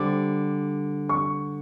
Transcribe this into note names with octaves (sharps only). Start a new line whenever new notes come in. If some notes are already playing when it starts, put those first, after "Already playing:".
Already playing: D3 G3 C4 D6
C#6